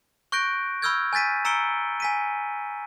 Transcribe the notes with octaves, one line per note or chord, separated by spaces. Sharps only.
C#6 F#6 G6 A#6 D7
B5 C#6 E6 F6 G6 G#6
G#5 G6 A6 B6 D#7
A#5 E6 C#7 D7 G7
G#5 B6 D#7